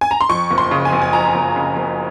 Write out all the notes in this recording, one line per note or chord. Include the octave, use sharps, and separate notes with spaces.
G#5
A#5
C6
F2 C#6
F#1
C6
C#3
G#5
F#1
G#5
F2 A#5
F#1
C#3
F#1